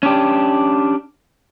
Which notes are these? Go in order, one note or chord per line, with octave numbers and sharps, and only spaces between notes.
C#4 D4 G4